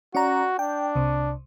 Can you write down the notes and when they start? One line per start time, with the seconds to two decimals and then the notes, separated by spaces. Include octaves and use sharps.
0.15 C#4 F#4 D5 A#5
0.59 D4 G5
0.95 C2 C3